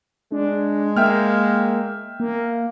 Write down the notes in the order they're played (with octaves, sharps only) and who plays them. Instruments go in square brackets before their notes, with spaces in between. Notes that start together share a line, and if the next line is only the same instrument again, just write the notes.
[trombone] G#3 [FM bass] D4
[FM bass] A#3 [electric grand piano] E5 G5 F6
[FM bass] A#3